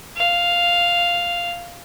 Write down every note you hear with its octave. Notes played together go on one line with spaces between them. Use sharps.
F5